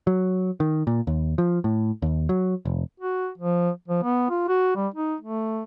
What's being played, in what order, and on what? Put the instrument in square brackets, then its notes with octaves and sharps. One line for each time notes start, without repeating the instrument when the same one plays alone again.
[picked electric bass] F#3
D#3
A#2
D#2
F3
A2
D#2
F#3
F1
[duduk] F#4
F3
F3
B3
F4
F#4
G3
D#4
A3